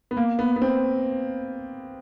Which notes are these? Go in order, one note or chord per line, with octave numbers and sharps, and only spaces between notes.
B3
A#3
B3
B3
C4